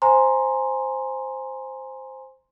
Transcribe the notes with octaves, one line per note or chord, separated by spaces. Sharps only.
C5 G#5 A#5 C6